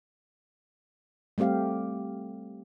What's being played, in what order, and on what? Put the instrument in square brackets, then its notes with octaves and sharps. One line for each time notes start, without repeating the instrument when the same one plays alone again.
[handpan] G3 A3 C4 G4 F5